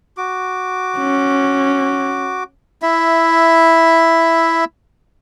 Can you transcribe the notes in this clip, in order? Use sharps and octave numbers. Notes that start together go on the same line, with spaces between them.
F#4 D6
C#4
E4 E5